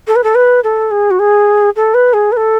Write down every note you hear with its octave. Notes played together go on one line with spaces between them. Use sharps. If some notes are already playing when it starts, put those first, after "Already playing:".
A4
B4
A4
B4
A4
G#4
F#4
G#4
A4
B4
G#4
B4
A4